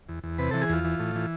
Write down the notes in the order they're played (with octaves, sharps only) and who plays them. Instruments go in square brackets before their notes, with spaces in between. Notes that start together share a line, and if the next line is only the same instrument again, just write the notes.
[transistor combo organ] E2
E2
C3 B4
E3 A4
G#4
E2 F4
E3
A2
E3